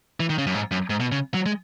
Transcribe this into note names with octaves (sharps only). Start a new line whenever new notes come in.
E3
D#3
C#3
F#2
G#2
F#2
G#2
B2
C#3
F#3
G#3